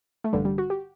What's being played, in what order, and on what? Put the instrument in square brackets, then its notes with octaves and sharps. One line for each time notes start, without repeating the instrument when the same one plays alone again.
[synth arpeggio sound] A3
A1 G2 D3 G3
G3
F#4
G4